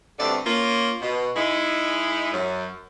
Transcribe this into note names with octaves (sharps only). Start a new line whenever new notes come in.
G2 B2 D3 A3 C4 D5
A#3 C#4 F4
B2
G#3 D#4 E4
F#2